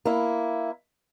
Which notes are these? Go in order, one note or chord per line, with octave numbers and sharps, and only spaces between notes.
A#3 E4